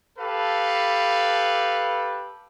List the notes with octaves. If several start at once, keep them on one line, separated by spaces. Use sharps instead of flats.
G4 A4 B4 F5